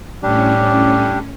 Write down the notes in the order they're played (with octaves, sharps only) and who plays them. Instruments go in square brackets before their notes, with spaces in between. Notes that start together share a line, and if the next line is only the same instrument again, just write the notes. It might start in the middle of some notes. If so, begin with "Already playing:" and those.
[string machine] A2 C#4 [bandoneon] G3 D4 G4